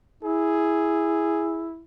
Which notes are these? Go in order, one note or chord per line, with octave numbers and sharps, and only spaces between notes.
E4 G#4